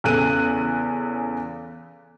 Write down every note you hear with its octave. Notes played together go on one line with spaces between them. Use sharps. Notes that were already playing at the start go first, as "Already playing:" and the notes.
E2 C#3 A4 F#6 D#7